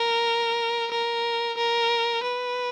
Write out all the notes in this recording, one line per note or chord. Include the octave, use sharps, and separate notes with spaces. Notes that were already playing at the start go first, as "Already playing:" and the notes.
Already playing: A#4
A#4
A#4
B4